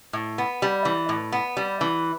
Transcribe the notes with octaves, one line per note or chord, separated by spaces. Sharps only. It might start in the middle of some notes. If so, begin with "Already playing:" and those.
A2
B3
G3
E3
A2
B3
G3
E3